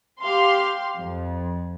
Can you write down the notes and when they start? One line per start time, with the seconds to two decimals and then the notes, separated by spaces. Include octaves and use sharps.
0.22 G4 F5 C6
0.97 F2